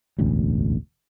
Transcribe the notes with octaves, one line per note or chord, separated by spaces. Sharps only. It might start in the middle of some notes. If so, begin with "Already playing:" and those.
E1 A1 D2